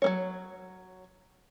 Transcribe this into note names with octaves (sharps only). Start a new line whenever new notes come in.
F#3 A#3 C#5